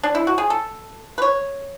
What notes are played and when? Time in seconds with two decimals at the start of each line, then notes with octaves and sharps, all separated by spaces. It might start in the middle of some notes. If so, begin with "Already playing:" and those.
0.03 D4
0.15 E4
0.27 F#4
0.38 G#4
0.50 A4
1.18 B4
1.22 C#5